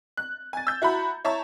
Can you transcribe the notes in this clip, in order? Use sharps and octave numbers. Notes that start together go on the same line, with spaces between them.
F#6
G#5 A6
E6 G6
E4 F#4 A#5 B5
E4 C#5 A5 A#5 C#6